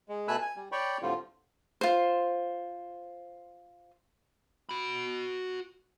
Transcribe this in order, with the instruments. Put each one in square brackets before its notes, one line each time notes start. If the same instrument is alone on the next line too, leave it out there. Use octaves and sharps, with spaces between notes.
[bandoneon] G#3
B2 A3 G#5 B5 E6 F#6
G#5
G3
C#5 D5 G5 B5 C#6
A2 D3 G3 C4 F4
[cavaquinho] F4 C5
[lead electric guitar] F#4 B5